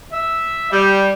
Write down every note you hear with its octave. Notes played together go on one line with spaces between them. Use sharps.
E5
G3